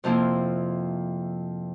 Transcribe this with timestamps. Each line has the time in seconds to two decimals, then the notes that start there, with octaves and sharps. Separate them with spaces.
0.04 F2 C3 F3 A#3 E4